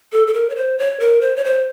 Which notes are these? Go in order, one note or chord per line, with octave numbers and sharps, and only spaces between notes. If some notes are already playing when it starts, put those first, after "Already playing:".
A4
A4
A#4
C#5
C5
C#5
A#4
C5
C#5
C5